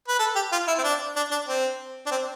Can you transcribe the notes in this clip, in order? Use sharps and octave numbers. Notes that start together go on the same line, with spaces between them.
B4
A4
G4
F4
E4
C4
D4
D4
D4
C4
D4
C4